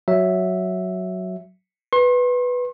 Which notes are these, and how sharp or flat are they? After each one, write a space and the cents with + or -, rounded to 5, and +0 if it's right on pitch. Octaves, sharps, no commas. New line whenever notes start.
F#3 +0 E5 +0
B4 +0 C6 +40